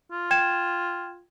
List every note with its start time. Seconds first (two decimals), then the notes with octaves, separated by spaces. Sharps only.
0.12 F4
0.31 G5 G#6 E7